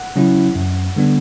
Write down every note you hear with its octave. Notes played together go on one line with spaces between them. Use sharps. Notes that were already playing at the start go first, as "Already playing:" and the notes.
Already playing: F#5
C#3 F#3 C#4 E4
F#2
D3 G3 B3 D4